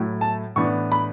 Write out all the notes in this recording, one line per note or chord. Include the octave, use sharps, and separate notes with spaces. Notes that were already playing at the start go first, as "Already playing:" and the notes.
Already playing: A2 F#3 A3 E4
A5
A2 E3 B3 D4 C#6
B5